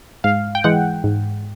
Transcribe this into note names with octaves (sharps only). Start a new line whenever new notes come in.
G#2 F5
G5
E3 G#3 F#5
G#2